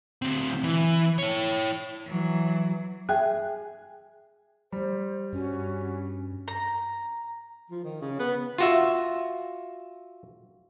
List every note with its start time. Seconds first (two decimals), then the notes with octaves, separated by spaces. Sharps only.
0.22 D2 C4
0.63 E3
1.18 E4 C#5
2.06 E3 F#3
3.09 G#4 E5 G5 F#6
4.72 G3 C5
5.33 G2 C#4 F#4
6.48 A#5
7.70 F3
7.83 D#3
8.01 C#3
8.19 B3
8.58 F4 F#4 E5